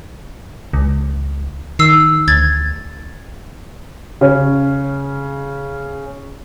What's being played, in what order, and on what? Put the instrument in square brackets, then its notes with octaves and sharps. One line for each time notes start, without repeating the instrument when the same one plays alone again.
[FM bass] C#2
[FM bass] D#3 [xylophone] E6 C7
[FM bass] D2 [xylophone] G#6 A6
[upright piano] C#3 C#4